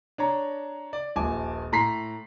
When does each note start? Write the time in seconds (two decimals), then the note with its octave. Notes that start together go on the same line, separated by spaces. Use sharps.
0.18 D4 C#5 A#5
0.93 D5
1.16 D#1 A#1 G#5 A5 D6
1.72 A2 A#5 C6 B6 C7